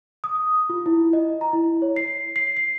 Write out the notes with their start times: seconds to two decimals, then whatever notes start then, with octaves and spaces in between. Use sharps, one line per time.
0.24 D#6
0.70 F4
0.86 E4
1.13 D#5
1.41 A#5
1.53 E4
1.82 C#5
1.96 C7
2.36 C7
2.57 C7